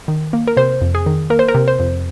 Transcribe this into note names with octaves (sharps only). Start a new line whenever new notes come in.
D#3
A#3
A#4
C3 C5
F2
G#4
D#3
A#3 A#4
C5
A#4
C3
C5
F2